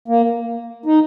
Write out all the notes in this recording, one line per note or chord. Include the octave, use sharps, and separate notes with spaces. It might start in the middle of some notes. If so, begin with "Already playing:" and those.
A#3
D#4